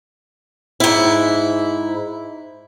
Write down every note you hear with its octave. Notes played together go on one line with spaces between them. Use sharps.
G#2 E4